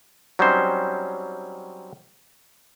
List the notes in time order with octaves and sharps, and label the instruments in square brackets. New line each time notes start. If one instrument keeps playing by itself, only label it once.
[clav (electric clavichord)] F#3 G3 C4 C#4 D#4 C5